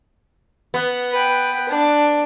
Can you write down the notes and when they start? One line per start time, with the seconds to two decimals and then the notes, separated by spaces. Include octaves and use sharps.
0.74 B3
1.12 B4 G5
1.69 D4